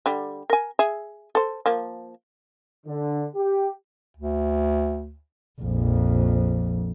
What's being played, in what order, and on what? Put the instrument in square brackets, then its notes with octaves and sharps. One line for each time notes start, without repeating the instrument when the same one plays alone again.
[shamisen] D3 G3
A#4 G#5
G#4 E5
A4 C5
F3 A#3
[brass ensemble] D3
G4
[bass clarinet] D2
[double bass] A#1 F2